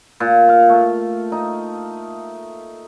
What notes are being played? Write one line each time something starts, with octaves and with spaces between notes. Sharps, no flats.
A#2
F5
A3
D#4